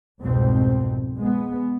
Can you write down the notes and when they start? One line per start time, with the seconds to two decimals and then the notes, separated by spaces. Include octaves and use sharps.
0.21 C2 F2 G#2 B2 C4
1.20 G#3 B3